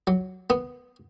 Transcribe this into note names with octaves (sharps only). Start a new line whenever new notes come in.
F#3
B3